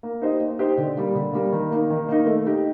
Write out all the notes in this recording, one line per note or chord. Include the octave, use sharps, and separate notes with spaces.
A#3
D#4 G4 C5 D#5
A#3
D#4 G4 C5 D#5
D3
G3 A#3
D3
G3 A#3
D#3
A#3 D#4
D#3
A#3 D#4
A3
D#4 G4